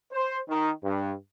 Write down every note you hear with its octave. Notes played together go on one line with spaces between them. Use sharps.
C5
D#3
G2